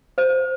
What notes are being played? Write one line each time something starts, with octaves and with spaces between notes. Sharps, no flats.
C5